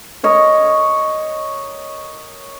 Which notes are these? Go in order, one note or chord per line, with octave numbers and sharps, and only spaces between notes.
A#4 C#5 D#5